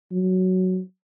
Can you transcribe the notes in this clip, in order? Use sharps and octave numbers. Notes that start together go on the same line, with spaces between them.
F#3